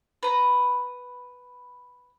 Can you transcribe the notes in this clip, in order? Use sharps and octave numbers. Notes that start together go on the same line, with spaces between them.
B4 A#5